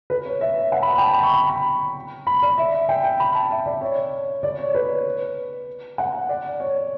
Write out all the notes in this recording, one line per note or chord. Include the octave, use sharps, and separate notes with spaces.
B4
C#5
E5
F#5
B5
B5
G5
A5
B5
C#6
B5
B5
B5
D5
E5
G5
G5
B5
A5
E5
D5
C#5
D5
C#5
B4
F#5
D5
C#5